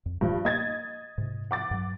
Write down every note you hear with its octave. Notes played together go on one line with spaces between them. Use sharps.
F2
D#1 G2 A#2 E3 F3
A#3 D#5 G#6 A6
G#2 C3
F#5 D6 A6
G2 F#3